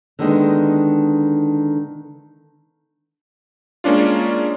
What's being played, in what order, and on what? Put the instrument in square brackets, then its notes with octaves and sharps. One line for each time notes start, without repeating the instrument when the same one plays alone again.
[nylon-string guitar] D3 D#3 G#3 B3
[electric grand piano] G#3 A#3 C#4 D4 F4